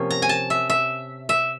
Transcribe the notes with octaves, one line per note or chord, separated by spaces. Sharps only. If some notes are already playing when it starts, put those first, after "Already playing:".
Already playing: C3 F3 A#3 C#4
A#5
G#5
A5
E5
E5
E5